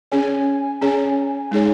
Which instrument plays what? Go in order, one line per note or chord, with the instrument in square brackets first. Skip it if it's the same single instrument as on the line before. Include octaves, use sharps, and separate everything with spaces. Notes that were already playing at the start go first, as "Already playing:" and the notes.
[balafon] C#4 G#4 C#5 [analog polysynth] G#5
[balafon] C#4 G#4 C#5
G#3 D#4 G#4 C#5